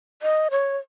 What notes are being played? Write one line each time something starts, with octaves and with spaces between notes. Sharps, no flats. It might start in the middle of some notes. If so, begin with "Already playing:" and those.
D#5
C#5